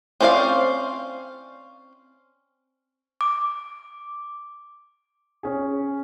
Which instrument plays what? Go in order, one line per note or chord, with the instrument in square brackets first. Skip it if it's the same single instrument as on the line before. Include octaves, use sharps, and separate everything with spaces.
[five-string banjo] C4 C#4 C5 D5 F5
[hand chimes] D6
[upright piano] C#4 G#4